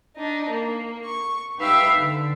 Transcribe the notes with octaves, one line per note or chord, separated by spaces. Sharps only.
D4 D#4
A#3
C#6
D#4 G4 B4 E5 F5 G5
D3